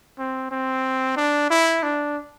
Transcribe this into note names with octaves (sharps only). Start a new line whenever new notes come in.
C4
C4
D4
E4
D4